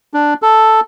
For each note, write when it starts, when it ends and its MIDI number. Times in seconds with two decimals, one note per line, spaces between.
0.14 0.34 62
0.42 0.80 69